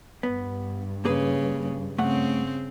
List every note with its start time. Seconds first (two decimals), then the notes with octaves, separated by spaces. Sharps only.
0.23 G2 B3
1.05 C#3 A#3 G#4 B4
1.98 C#3 A3 C4 F#5